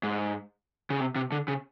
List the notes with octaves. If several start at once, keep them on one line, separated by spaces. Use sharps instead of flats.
G#2
C#3
C3
C3
D3
C#3